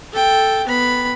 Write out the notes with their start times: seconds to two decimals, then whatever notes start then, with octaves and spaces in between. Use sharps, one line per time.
0.12 A4 G5
0.67 B3 B5